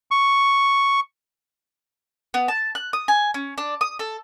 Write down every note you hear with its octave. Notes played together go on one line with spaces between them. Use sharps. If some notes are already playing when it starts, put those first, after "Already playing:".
C#6
B3
A5
F#6
D#6
G#5
C#4
D4
D#6
A4